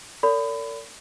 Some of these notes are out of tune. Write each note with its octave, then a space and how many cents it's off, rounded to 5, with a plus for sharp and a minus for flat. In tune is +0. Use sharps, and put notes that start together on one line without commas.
A#4 -45 D5 -40 B5 +25